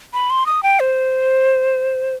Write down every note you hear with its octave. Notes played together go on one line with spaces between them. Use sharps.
B5
C6
D#6
G5
C5